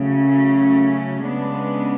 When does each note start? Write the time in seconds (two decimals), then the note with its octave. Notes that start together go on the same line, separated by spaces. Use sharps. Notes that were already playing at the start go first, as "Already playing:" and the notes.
Already playing: C#3 F#3 A3
0.12 C#4
1.23 C#3 G#3 B3 D4